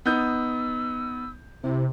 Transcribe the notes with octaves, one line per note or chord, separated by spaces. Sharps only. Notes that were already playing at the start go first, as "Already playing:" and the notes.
B3 D#4 E6 G6
C3 E4